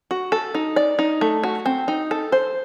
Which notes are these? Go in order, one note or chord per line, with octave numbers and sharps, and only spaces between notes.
F#4
A4
D#4
D5
D#4
A3
F#4
C4
D#4
A4
C5